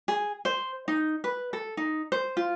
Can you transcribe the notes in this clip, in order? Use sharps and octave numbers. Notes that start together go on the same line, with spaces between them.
G#4
C5
D#4
B4
A4
D#4
C5
F4